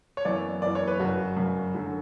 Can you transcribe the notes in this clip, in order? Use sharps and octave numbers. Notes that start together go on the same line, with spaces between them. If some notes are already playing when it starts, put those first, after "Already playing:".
C#5
F#1 F#2 E3 B3 E4 D5
F#1 F#2 E3 B3 E4 D5
C#5
B4
G1 F#2 C#3 F#4
G1 F#2 C#3
F#2 D3 F#3